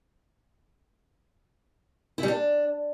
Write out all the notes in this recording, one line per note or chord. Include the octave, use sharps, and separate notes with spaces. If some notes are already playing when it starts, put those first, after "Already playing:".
E4
G3
D4